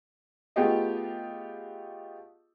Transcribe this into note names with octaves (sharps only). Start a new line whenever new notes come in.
A3 B3 F4 G4 G#4 D#5